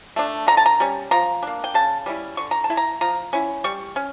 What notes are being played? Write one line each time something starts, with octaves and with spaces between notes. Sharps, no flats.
A3 D4
D3 A#5
A5
A#5
G3 C#4
F3 A#5
A#3 D4
G5
C#3 A5
G3 C#4 E4
D3 C#6
A#5
A5
A3 E4
A#5
F3 A#5
C#4 E4
G3 C#6
C#4